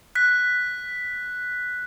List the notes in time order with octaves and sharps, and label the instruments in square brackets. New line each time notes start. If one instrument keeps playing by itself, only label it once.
[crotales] F#6 B6